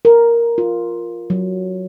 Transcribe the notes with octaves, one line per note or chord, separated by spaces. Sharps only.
A#4
F4
F#3